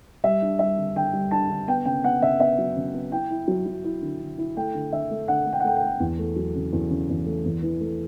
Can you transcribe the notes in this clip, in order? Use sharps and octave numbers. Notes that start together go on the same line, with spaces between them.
G3 E5
D4
G3 E5
D3
D3 G5
G3
D4 A5
D3
B3 G5
C#3 G5
B3 F#5
C#3 E5
B3 E5
F#3
C#3
B3
E4 G5
E4
F#3
F#3
E4
D3
D3
E4
A3 G5
D3
D3 E5
A3
D3 F#5
A3
G5
F#5
A3 G5
G5
A3
E2
A3
F#3
C#3
E2
C#3
E2
A3
E2
E3
A3